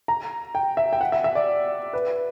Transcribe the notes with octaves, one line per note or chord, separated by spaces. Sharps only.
A#5
G5
E5
G5
F#5
E5
E5
D5
B4